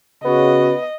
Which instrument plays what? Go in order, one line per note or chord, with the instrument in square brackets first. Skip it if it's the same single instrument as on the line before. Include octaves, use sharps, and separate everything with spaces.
[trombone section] C#3 F#4 [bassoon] B3 [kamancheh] D#5